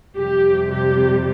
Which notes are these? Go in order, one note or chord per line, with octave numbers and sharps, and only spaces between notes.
F2 C3 G3 G4
G4